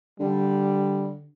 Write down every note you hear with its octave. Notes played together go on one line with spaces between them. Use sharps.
D3 G3